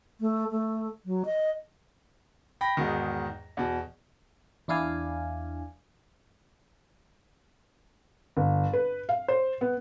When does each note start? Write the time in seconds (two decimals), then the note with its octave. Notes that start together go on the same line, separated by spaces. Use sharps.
0.20 A3
0.51 A3
1.06 F#3
1.25 D#5
2.61 G5 B5 A#6
2.77 E2 G#2 B2 D#3
3.57 E2 B2
4.68 E2 D4 E4 D5 F5 G#5
8.37 G1
8.73 B4
9.09 F5
9.28 C5
9.61 B3